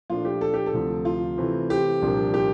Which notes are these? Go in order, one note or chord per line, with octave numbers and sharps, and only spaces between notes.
A#2 F3 A3 D4 F4
G4
A4
G4
A4
D2 C3 F3
F4
C3 E3 A3 C4
G4
C2 A#2 F3 A#3 D4
G4